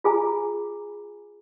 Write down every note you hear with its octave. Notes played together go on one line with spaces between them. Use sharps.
F4 G#4 G#5 A#5